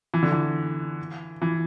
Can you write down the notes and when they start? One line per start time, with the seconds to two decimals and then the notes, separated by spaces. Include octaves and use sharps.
0.14 E3
0.23 D3
0.31 E3
1.42 E3